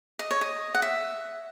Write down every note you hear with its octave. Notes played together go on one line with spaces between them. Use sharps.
D#5
C#5
D#5
F#5
E5